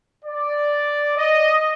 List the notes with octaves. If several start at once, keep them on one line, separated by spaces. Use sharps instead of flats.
D5
D#5